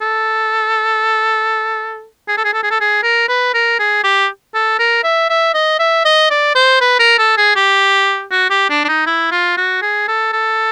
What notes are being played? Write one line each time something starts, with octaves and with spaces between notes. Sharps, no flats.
A4
G#4
A4
G#4
A4
G#4
A4
G#4
A#4
B4
A#4
G#4
G4
A4
A#4
E5
E5
D#5
E5
D#5
D5
C5
B4
A#4
A4
G#4
G4
F#4
G4
D4
D4
D#4
E4
F4
F#4
G#4
A4
A4